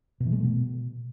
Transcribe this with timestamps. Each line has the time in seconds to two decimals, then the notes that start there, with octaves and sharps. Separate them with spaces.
0.20 B2
0.26 E3
0.32 G#3
0.38 A3
0.44 B2